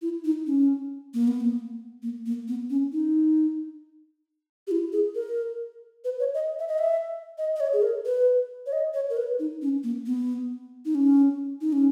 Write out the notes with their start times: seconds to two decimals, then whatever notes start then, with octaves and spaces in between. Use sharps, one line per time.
0.02 E4
0.24 D#4
0.47 C#4
1.14 A#3
1.28 B3
1.41 A#3
2.03 A#3
2.26 A#3
2.48 B3
2.70 C#4
2.93 D#4
4.67 G4
4.71 E4
4.93 G#4
5.15 A#4
6.05 B4
6.20 C#5
6.34 D#5
6.59 E5
6.68 D#5
6.78 E5
7.38 D#5
7.56 D#5
7.60 C#5
7.73 G#4
7.82 A#4
8.06 B4
8.66 C#5
8.72 D#5
8.94 C#5
9.10 A#4
9.17 B4
9.39 D#4
9.62 C#4
9.84 A#3
10.06 B3
10.85 D#4
10.95 C#4
11.61 D#4
11.73 C#4